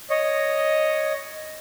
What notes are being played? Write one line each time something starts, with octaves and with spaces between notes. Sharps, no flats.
C#5 D#5